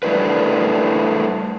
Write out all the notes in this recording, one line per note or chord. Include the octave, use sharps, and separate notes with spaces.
G3 A3 D4 E4 A#4 B4